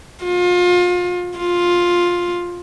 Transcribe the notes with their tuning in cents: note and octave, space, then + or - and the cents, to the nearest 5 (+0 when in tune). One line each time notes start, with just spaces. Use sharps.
F4 +30
F4 +10